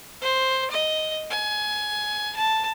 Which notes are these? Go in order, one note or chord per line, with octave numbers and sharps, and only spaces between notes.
C5
D#5
G#5
A5